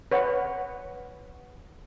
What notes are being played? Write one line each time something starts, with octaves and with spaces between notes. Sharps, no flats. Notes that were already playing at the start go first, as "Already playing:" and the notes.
B4 C#5 F#5